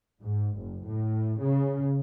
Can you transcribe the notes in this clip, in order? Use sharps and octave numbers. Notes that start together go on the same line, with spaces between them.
G#2
F#1
A2
C#3